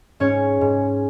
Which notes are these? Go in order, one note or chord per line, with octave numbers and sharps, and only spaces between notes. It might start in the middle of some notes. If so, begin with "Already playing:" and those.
G#2 C#4 C#5
G#2